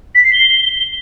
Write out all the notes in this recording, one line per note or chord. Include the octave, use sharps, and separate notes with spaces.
B6
C7
G7